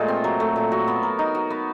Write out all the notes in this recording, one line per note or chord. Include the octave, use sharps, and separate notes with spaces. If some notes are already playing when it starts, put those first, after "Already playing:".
Already playing: A#2 G#3 A3 F4
C4
F#3
A3
A#2
F#4
B3
A#4
D#4
F#4
B3